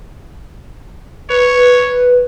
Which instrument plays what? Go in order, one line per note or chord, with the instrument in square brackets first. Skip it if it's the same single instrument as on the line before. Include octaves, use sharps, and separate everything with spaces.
[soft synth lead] B4 [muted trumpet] C#5